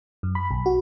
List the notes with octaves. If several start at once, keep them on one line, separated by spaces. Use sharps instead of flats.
F#2
B5
B1
F#4